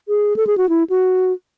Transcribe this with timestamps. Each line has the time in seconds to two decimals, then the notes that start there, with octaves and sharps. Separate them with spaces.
0.08 G#4
0.36 A4
0.47 G#4
0.58 F#4
0.69 E4
0.90 F#4